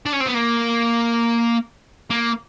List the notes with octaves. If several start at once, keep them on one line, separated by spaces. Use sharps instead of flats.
D4
C#4
C4
B3
A#3
A#3